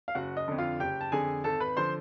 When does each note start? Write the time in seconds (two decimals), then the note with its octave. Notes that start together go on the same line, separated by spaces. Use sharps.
0.08 F5
0.15 F#1 F#4 F#5
0.37 D#5
0.48 F2 D3
0.58 F4 F5
0.80 F#1 G4 G5
1.01 A5
1.12 F2 D3 G#4 G#5
1.44 G#1 A4 A5
1.60 B4 B5
1.77 D3 F3 C5 C6